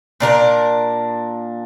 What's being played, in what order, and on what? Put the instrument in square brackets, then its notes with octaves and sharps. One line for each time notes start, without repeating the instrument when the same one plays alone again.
[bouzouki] A#2 D4 A#4 A#5